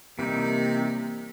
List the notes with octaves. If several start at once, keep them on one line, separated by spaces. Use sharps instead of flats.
C3 E3 G3 A#3 D#4